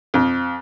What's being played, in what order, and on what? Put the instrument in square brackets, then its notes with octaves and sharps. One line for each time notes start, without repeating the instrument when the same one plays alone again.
[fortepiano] F2